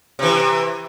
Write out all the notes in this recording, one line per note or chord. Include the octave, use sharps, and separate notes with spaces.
C3 E3